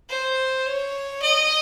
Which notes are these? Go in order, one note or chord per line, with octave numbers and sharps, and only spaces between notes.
C5
C#5
D#5